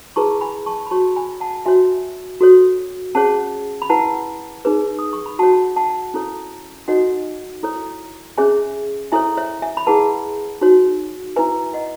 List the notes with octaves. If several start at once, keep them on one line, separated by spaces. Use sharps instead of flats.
E4 G#4 B4 A5 C#6
G#5 B5
A5 C#6
B5
F#4 C#5 A5 C#6
G#5 B5
F#5 A5
F#4 C#5 E5 G#5
F#4 A4 C#5
C#4 G#4 C#5 F#5 A5
B5
E4 B4 F#5 A5
D#4 G#4 B4
D#6
C#6
B5
F#4 C#5 F#5 A5
F#5 A5
C#4 E4 A4 C#5
D#4 F#4 A4 C#5 D#5 F#5
E4 A4 C#5
C#4 G#4 C#5 E5 G#5
E4 A4 C#5 E5 G#5
C#5 E5
E5 G#5
B5
E4 G#4 B4 F#5 A5
D#4 F#4 C#5
E4 B4 E5 G#5
D#5 F#5